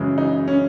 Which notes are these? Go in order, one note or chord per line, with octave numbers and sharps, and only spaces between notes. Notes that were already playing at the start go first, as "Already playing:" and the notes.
Already playing: F#2 C#3 E3 G#3
D#4
C#4